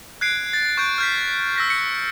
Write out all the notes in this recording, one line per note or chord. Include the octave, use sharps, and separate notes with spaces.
F#6 G#6 C7 D7
A6
C#6 F#6 G6 D7
F6 G6 B6
E6 A#6 B6
C#7